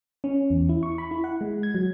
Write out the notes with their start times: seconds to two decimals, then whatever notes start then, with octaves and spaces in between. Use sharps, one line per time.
0.24 C#4
0.50 E2
0.69 E4
0.83 C#6
0.98 B5
1.11 E4
1.24 F#5
1.41 G#3
1.63 G#6
1.75 F#3